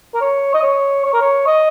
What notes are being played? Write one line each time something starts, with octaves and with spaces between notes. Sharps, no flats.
A#4
C#5
D#5
C#5
C#5
A#4
C#5
D#5